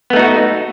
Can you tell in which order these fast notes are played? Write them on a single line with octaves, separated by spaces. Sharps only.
B3 A3 D#4 F#4